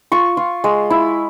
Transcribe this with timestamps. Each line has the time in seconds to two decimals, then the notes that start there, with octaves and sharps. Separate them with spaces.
0.12 F4 C#6
0.37 F4
0.64 G#3
0.90 E4